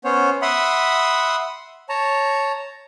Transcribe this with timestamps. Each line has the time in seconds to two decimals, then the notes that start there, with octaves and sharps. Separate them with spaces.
0.04 B3 C#4 C5 C#5
0.42 E5 F#5 B5 C6 D#6
1.89 C#5 A5 A#5